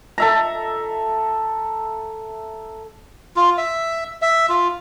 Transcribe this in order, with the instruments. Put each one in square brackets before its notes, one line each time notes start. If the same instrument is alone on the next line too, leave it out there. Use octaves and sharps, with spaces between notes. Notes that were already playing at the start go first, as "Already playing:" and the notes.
[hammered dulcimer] A4 E5 A#5
[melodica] F4
E5
E5
F4